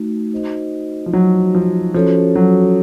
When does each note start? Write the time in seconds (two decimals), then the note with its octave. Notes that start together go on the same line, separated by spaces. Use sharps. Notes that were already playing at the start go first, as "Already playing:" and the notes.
Already playing: A3 D#4 F#4
0.32 D#4 F#4 C5 D#5
1.06 F3
1.13 F#3
1.55 F3
1.94 F3 C#4 F#4 A4 C#5
2.36 F#3